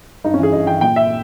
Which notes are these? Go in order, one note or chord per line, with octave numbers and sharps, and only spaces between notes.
G2 D#4
C#4
E3 G#4
G2 D#5
E3 G5
A#2 G5
E5